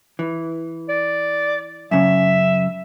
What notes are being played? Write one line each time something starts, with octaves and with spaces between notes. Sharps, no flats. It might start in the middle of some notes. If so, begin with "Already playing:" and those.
E3
D5
F#2 C#3 E5